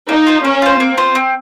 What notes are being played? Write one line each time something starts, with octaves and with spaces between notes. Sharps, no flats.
A#3 D#4
F4 C5
A#3 C#4
F4 C5
A#3 C4
F4 C5
C4